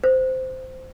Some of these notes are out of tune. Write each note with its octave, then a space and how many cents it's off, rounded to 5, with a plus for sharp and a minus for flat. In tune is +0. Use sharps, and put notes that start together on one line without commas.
C5 -10